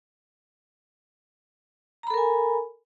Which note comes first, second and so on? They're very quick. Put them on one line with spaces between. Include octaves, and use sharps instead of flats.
A#5 B5 A4 A#4 G#5